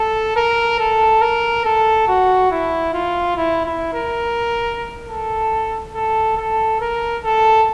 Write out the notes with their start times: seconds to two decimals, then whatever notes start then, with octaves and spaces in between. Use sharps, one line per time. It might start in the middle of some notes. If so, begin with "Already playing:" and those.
Already playing: A4
0.36 A#4
0.79 A4
1.21 A#4
1.65 A4
2.08 F#4
2.51 E4
2.93 F4
3.37 E4
3.66 E4
3.94 A#4
5.08 A4
5.95 A4
6.37 A4
6.80 A#4
7.24 A4